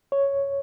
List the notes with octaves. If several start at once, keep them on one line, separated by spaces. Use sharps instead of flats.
C#5